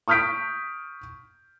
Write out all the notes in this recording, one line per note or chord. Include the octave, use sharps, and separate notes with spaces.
C#6 D#6 F6 G6 B6 D7